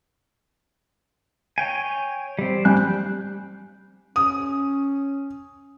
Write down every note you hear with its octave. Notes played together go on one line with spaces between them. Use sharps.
C#5 G5 G#5
G3 C4
G3 G#5 F#6 G6
C#4 D#6